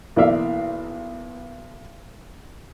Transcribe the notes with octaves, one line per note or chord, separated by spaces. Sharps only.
B1 E3 A#3 D5 E5 F5